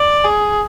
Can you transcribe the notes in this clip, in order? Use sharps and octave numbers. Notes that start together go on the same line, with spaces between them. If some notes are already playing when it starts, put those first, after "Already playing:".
Already playing: D5
G#4